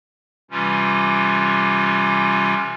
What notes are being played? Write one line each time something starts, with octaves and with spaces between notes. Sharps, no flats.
C3 E3 G3 C#4 F4